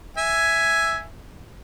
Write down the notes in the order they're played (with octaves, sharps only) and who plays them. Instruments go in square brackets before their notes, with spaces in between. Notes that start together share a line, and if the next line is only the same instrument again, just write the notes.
[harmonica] E5 G#5